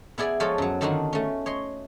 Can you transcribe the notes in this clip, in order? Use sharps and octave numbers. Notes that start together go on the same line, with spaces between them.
B3 E4 G#4 D5 E5 G#5
F3 G#3 F4 A4 C#5
F#2 F#3
D3 D#3 D4 D#4 F4 F#4
A3 C#4
C#5 D#5 C6